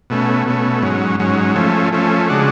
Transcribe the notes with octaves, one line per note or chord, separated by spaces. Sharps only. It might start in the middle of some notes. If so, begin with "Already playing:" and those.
B2 A3 C#4
B2 A3 C#4
G#2 F#3 C#4
G#2 F#3 C#4
F3 A3 C#4
F3 A3 C#4
C#3 G#3 D4 F#4